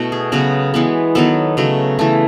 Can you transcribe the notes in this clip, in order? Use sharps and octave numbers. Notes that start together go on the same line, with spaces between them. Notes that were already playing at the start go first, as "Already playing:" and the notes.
Already playing: B2 A3 E4 F#4
G#4
C#3 F#3 B3 F#4
E3 G#3 B3
D#3 F#3 B3 A4
C#3 F#3 A3
E3 A3 A4